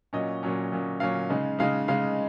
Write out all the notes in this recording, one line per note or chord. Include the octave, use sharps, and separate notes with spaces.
A#2 F#3 C#4 D#5
A#2 F#3 C#4
A#2 F#3 C#4
A#2 F#3 C#4 F5
C#3 G#3 D#4
C#3 G#3 D#4 F5
C#3 G#3 D#4 F5